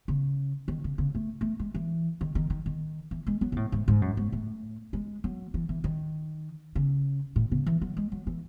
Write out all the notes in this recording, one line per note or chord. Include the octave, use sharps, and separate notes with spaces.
C#3
D#3
C#3
C#3
A3
A3
G#3
E3
D#3
D#3
D#3
D#3
E3
G#3
F#3
B2
A2
G#2
G#2
F#2
G#2
A2
G#3
F#3
E3
E3
D#3
C#3
A2
C#3
E3
F#3
G#3
F#3
E3